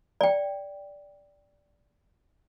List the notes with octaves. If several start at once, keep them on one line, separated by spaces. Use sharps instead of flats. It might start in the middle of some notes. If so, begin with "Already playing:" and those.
D5 G5